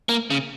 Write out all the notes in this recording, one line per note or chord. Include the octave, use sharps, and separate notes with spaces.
A#3
C#3